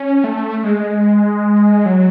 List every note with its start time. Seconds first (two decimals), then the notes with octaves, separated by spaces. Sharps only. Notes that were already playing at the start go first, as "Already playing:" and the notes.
Already playing: C#4
0.24 A3
0.64 G#3
1.86 F#3